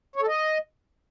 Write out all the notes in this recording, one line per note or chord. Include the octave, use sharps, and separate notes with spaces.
C#5
A4
D#5